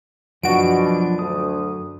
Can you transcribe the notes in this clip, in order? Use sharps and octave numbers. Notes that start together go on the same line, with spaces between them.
F#2 B2 F3 D4 F#4 D7
D2 D#6